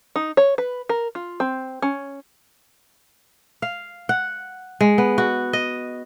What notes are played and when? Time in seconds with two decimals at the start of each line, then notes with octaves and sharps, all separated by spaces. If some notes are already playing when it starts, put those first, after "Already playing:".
0.16 D#4
0.37 C#5
0.58 B4
0.89 A#4
1.15 F4
1.40 C4
1.82 C#4
3.62 F5
4.09 F#5
4.81 G#3
4.98 B3
5.18 F#4
5.53 D#5